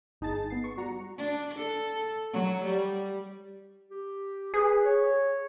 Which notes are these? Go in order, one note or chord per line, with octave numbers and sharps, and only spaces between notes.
G1 D#4 G#4 A5 A6
B3 C7
C#6
G3 F#4 A#5 C#7
D4
A4
F#3
G3
G4
G#4 B4
C#5